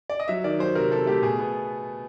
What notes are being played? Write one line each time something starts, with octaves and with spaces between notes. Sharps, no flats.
D5
D#5
F#3 E5
D#3 D5
F#3 C5
C3 A#4
C3 A4
A3 G4
B2 G#4
B3